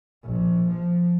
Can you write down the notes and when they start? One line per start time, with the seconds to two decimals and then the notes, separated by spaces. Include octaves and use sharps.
0.24 A#1
0.67 F3